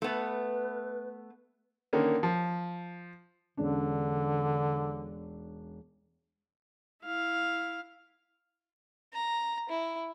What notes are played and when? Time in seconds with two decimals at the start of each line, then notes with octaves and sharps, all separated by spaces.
0.02 A3 B3 B4
1.93 D3 D#3 A#3 C#4
2.23 F3
3.57 E1 D3 C#4 D4
7.04 E4 F5
9.13 A#5
9.69 E4